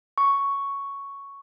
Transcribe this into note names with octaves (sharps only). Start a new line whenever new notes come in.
C#6